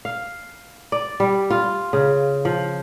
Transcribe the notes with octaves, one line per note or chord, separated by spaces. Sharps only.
F5
D5
G3
F4
C#3
F3